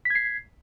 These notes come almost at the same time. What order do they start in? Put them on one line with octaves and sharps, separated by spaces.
B6 G#6 C7